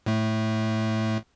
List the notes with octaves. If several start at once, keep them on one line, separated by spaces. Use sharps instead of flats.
A2 A3